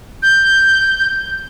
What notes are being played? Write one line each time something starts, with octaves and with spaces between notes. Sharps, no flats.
G6